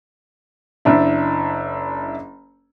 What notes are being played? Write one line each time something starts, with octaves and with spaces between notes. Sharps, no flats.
F#1 D4 E4